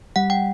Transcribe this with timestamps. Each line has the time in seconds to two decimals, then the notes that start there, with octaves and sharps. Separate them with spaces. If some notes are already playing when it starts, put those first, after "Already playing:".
0.16 G3 F#5
0.30 G5